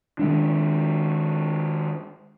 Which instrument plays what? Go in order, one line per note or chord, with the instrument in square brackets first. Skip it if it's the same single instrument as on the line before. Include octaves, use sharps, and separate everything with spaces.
[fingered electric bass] D#3 G#3 D4